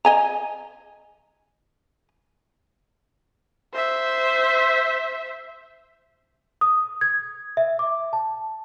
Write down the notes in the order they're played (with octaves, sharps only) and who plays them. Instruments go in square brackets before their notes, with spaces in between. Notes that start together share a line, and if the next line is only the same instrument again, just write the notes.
[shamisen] D#5 G#5 A#5
[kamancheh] C5 E5
[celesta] D#6
G#6
E5
D6
A5